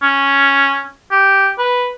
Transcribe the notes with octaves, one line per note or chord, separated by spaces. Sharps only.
C#4
G4
B4